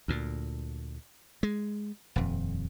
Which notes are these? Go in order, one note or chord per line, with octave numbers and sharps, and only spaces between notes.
D2 A#2
G#3
D#1 F2